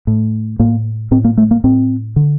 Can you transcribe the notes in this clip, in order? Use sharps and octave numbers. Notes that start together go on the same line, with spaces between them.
A2
A2 A#3
A2 C4
A#3
A3
A#3
A2 C4
D3